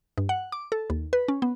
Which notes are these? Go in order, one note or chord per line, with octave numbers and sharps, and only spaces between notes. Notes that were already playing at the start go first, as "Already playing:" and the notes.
G2
F#5
D6
A4
D#2
B4
C#4
B3